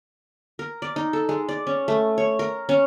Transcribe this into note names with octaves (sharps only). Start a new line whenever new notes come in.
A#4
D5
D#4
A4
G#3
D5
C#4
A3
C#5
A#4
C#4